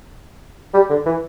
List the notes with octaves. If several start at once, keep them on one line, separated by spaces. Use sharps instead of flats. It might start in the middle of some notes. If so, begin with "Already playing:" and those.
G3
D3
E3